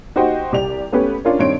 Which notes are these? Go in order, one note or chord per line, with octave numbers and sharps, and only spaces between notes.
D#4 F#4 G4 C5 D#5 G5
C2 G4 D5 F7
A3 B3 C#4 G4 B4
C#4 D4 F4 A#4 C#5
G2 D#3 C4 C#5 C6 D7